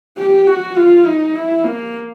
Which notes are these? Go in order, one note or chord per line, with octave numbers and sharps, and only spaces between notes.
G4
F#4
F4
D#4
E4
A#3